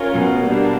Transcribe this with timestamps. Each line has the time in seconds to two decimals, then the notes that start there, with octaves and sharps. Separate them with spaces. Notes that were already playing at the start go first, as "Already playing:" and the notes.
Already playing: C#4 F4 A#4 C#5
0.12 B2
0.41 G3 A#3 D4